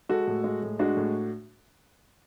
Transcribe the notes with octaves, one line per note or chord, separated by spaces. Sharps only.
G#3 F#4 A4
A2
G#3
A2
G#3 D4 F#4
A2